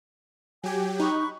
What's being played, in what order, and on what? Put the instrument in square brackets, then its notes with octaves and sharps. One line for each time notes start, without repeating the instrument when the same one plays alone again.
[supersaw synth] F#3 G4 [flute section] G5 G#5 G#6
[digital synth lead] D#4 [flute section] B5 C#6 F#6